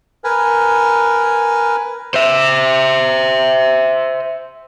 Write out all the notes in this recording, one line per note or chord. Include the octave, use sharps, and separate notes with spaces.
A#4 B4 G#5
C5 E5